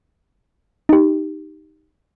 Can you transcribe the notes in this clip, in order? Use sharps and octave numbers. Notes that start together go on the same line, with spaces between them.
D#4 G4